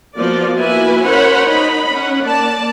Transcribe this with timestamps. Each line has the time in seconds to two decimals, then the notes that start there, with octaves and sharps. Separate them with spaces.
0.18 F3 A#3 B3 F4 F#4 D5
0.58 A#3 E4 F#4 B4 E5 G#5
1.06 C#4 A#4 C5 C#5 F#5 B5
1.45 D#4 B5
1.94 C#4 F#5
2.23 A#3 D5 A5